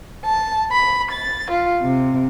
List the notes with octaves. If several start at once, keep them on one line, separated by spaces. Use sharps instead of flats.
A5
B5
A6
F4
C3